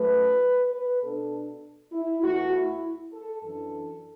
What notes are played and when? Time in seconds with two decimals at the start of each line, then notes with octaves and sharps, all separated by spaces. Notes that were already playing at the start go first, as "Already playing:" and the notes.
Already playing: F#2 F#3 A3 B4
0.73 B4
1.02 B2 B3 D4 A4
1.92 E4
2.22 E2 E3 A3 F#4
2.53 E4
3.13 A4
3.43 F#2 E3 D4 A4